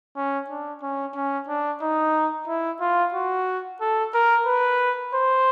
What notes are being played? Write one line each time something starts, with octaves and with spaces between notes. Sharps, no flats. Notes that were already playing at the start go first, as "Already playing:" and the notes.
C#4
D4
C#4
C#4
D4
D#4
E4
F4
F#4
A4
A#4
B4
C5